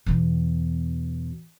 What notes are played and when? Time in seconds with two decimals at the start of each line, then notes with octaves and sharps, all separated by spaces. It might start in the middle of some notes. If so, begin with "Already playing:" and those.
0.06 E2 B2